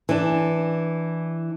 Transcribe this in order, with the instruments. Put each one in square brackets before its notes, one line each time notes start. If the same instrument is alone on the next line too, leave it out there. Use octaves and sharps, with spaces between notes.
[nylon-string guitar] E3 D4